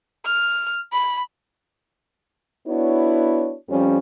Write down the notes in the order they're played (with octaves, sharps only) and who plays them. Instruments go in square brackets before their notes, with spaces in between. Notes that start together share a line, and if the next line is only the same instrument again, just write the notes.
[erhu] F6
B5
[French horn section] B3 D4 E4 F#4 C#5
F2 F3 G3 C#4